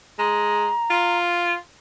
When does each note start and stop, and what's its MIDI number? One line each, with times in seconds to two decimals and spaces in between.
0.19 0.69 56
0.19 1.18 82
0.90 1.54 65